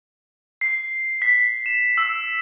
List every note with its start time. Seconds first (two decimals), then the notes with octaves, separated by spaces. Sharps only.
0.61 C7
1.22 B6
1.66 E7
1.98 E6